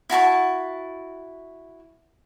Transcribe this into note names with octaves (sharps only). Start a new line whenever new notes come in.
E4 F#4 A5 C#6